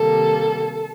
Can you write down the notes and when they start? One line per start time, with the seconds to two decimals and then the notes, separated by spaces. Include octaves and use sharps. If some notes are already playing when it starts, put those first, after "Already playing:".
Already playing: C3 D#3 G3 A#3 A4